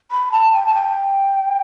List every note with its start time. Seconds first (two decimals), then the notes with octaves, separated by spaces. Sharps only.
0.11 B5
0.32 A5
0.53 G5
0.66 A5
0.74 G5